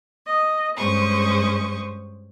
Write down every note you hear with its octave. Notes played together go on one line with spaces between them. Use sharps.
D#5
G2 G#3 C#4 C5 C#6 D#6